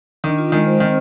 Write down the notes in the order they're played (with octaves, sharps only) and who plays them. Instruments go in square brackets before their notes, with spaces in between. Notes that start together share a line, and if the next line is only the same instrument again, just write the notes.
[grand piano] D#3 [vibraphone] D4
[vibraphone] F4
[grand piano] D#3 [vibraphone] G#3
[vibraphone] C5
[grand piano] D#3 [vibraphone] C4